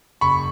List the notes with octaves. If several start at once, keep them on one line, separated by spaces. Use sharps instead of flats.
F#1 B5 C#6